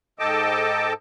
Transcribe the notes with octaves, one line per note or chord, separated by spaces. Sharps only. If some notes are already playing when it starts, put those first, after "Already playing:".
G#2 A4 D#5 G5 A5 D6